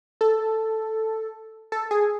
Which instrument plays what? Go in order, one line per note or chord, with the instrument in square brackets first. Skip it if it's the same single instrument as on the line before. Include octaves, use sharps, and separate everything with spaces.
[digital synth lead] A4
A4
G#4